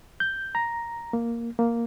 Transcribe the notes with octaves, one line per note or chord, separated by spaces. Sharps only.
G6
A#5
A#3
A#3